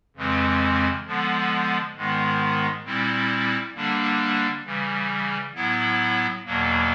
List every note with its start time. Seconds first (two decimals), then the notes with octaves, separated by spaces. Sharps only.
0.16 F2 C#3 E3 G#3 C4
1.06 D3 F3 G#3 B3
1.96 G#2 D#3 G#3 B3
2.85 A#2 G3 C4 E4
3.75 D3 G3 A#3 D4
4.66 C#3 E3 G3
5.55 A2 F#3 B3 E4
6.46 E2 B2 F#3 A#3